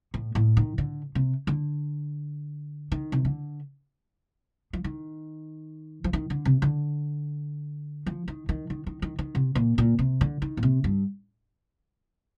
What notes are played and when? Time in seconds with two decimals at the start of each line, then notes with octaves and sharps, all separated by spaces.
0.14 A2
0.35 A2
0.57 D#3
0.78 D3
1.15 C3
1.47 D3
2.92 D#3
3.12 C3
3.25 D3
4.73 F3
4.84 D#3
6.04 F3
6.13 D#3
6.30 D3
6.45 C3
6.62 D3
8.06 F3
8.28 D#3
8.49 D#3
8.70 D#3
8.87 D#3
9.02 D#3
9.19 D#3
9.35 C3
9.55 A#2
9.78 A#2
9.99 C3
10.21 D3
10.42 D#3
10.57 A#2
10.63 C3
10.84 G2